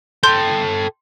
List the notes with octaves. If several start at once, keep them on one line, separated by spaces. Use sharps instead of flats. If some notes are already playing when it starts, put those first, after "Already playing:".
A4 G5 C6 G6